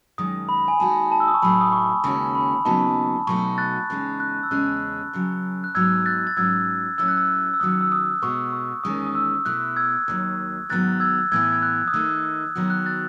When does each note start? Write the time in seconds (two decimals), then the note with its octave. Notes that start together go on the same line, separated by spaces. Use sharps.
0.18 F#2 D#3 G#3 D#6
0.49 B5
0.68 G#5
0.80 D#2 D#3 G#3 D#4 F#4 A5
1.12 A5
1.20 E6
1.28 D#6
1.34 C#6
1.42 A2 F#3 A3 D#4 B5
1.61 D#6
1.73 C#6
2.04 D#2 C#3 G#3 C#4 F#4 C#6
2.35 B5
2.65 D#2 C#3 F#3 B3 D#4 A5
3.27 B2 F#3 A3 D#4 F#4 C#6
3.58 F#6 A6
3.90 E2 C#3 G#3 D#4
4.20 F#6
4.43 E6
4.51 E2 C#3 G#3 C#4 F#6
5.13 F#2 C#3 F#3
5.64 F#6
5.75 G#2 F#3 B3 D#4 E6 G#6
6.06 F#6 A6
6.27 A6
6.37 G#2 F#3 C#4 E6 G#6
6.98 A2 F#3 C#4 E4 E6
7.08 F#6
7.18 E6
7.54 E6
7.60 D#3 F#3 C#4 D#6
7.81 E6
7.92 D#6
8.22 B2 G#3 B3 F#4 C#6
8.53 C#6
8.84 E2 D#3 G#3 C#4 D#6
9.06 D#6
9.15 E6
9.45 B2 A3 E4 F#6
9.77 E6 G#6
10.08 D#2 D#3 F#3
10.69 G#2 D#3 F#3 B3 F#6 A6
11.00 E6 G#6
11.32 A2 E3 B3 E4 E6 G#6
11.53 G#6
11.62 F#6
11.88 D#6
11.93 D#3 A3 D#4 E6
12.55 D#3 F#3 B3 F#4
12.70 F#6
12.86 F#6 A6